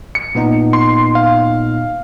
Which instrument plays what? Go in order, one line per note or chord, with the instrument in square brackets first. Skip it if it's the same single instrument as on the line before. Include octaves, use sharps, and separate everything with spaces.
[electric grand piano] C#7
[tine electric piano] A#2 B3 D#4
[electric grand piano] C6
F5